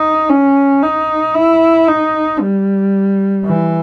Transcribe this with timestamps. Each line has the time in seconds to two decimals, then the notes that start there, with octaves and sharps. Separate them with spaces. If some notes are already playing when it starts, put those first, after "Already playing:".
Already playing: D#4
0.30 C#4
0.82 D#4
1.35 E4
1.88 D#4
2.40 G3
3.46 E3